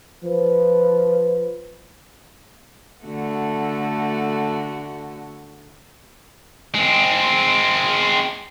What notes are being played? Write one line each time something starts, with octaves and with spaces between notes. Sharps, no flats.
F3 B4
D3 A3 F#4
G#3 C4